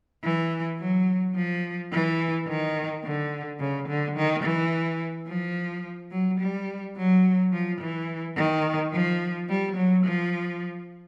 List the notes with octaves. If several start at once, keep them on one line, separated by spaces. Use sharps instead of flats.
E3
F#3
F3
E3
D#3
D3
C#3
D3
D#3
E3
F3
F#3
G3
F#3
F3
E3
D#3
F3
G3
F#3
F3